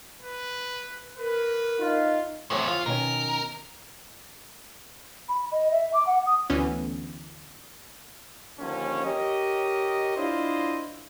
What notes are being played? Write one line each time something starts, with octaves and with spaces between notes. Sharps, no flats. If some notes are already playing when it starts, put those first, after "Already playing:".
B4
A#4 B4
D#4 F4
E2 A2 C3 C5 C#5
F4
B2 D#3 C#4 A#4
B5
D#5
E5
D6
F#5
D#6
D2 D3 E3 B3 C#4
D#2 D3 F3 C#4
G4 A#4 C#5 D#5
D4 E4 F4 C5 D#5